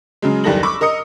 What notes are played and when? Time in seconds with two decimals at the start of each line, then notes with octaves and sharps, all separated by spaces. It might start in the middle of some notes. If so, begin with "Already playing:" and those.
0.22 C#3 F#3 G#3
0.44 F#1 D#2 G3 A4 A#6 F#7
0.63 B5 C#6 D6 E6
0.81 A#4 D#5 D#6 C#7